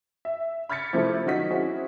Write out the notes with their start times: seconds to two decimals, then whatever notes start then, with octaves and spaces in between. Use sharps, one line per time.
0.25 E5
0.69 B5 F6 G#6 A6 B6 C#7
0.93 C3 F3 A3 E4 A4
1.26 D#3 F#3 F#4 D#5 B6
1.51 C4 C#4 E4 F#4 G#4